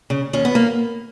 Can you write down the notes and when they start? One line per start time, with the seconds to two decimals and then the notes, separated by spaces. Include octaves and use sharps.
0.10 C#3
0.33 D#2 C#4
0.45 B3
0.55 A#3